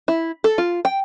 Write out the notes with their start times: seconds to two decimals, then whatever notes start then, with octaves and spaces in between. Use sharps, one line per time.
0.08 E4
0.44 A4
0.58 F4
0.85 G5